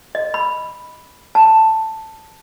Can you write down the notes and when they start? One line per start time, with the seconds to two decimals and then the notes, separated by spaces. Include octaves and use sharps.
0.15 D#5
0.34 B5
1.35 A5